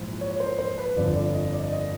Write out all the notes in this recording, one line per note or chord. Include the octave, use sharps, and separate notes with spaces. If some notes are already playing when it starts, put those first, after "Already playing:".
Already playing: A#1 G#2 E3
C#5
C#5
C5
C5
B4
G1 F2 D3 D5
D5
D#5
D5
D#5